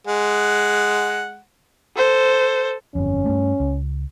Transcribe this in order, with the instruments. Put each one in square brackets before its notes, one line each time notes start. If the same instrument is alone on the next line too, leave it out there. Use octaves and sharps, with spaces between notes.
[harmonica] G#3 F#5
[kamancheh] A4 C5
[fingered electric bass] G1 F2 [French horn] C#4
[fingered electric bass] G2 A3
C#2